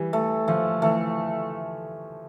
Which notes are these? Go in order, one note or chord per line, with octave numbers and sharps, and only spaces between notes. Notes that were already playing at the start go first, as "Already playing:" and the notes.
Already playing: E3 G3
A3
F3 A3
E3 A3